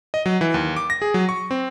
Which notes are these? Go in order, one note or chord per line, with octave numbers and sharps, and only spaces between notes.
D#5
F#3
E3
D#2
D6
A#6
G#4
F#3
C#6
C4